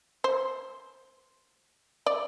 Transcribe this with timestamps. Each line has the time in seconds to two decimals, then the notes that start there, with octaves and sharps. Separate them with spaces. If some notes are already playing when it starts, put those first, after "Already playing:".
0.24 C5
2.06 D5